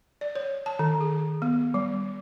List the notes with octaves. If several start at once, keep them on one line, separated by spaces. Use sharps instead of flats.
D5
C#5
A5
D#3
G#4
B3
G3